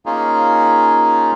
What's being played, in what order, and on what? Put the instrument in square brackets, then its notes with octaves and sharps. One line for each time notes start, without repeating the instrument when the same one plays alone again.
[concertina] A#3 C#4 D#4 F4 G#4